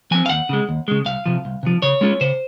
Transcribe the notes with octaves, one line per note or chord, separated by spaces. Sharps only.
F3 C4 G#5
F5
D#2 F#5
C#3 G#3
D#2
C#3 G#3
C2 F5
C3 F3
C2
C3 F3
C#3 C#5
G#3 C#4 F4
C#3 C5